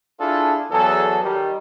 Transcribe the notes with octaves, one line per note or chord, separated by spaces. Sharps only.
D4 E4 F4 G#4 A4
E2 F#3 G#4 A4
D#3 G3